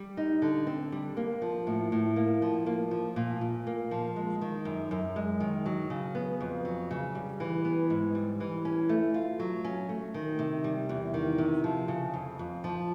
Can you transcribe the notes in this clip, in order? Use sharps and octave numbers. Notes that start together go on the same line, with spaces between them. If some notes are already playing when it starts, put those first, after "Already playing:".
Already playing: G3
D#4
D3
C4
G3
A#3
F3
A2
A2
A#3
F3
A#3
F3
A#2
A#2
A#3
F3
G#3
D#3
F#2
F#2
G#3
D#3
F#3
C#3
B3
F2
F#3
C#3
G3
E3
B3
G#2
G3
E3
C#4
A3
F4
F#3
C#4
A3
D#3
C3
G3
E2
D#3
C3
F3
C#3
F2
F2
F3